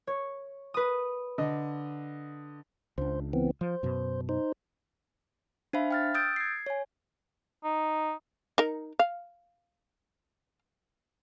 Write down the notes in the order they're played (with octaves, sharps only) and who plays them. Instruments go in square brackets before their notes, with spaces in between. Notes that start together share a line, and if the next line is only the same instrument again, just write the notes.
[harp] C#5
B4 D#6
[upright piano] D3 D#5
[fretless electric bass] C#2 D4 [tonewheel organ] C5
[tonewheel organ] E3 B3 C4
[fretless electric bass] F3 [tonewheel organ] C5
[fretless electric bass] F#2 B2
[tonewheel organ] D#4 C5
[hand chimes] D4 C5 E5 F5 B5
G5 F6 A6
D#6 E6 G6 A6 D7
G#6 C7
C#5 G#5
[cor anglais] D#4
[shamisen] D#4 A#4
F5